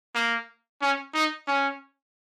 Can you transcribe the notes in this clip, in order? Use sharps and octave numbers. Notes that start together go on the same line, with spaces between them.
A#3
C#4
D#4
C#4